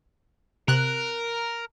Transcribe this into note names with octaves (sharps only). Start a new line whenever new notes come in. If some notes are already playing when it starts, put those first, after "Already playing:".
C3 A#4 F#6